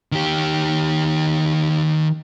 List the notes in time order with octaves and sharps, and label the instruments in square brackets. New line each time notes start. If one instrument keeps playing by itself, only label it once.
[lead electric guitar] D#3 G4